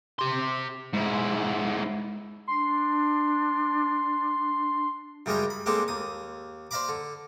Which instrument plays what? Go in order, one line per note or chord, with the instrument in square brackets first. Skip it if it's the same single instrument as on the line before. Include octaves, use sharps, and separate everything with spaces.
[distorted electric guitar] G4 C6
G#2 E4
[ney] D4 [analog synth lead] C6
[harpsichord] F#2 C#3 G3 G#3 A#4 G5
B5
G#3 A#3 C4 D4 G4 A4
D#2 D#6
C5 D5 F5 A#5 B5 D6
D3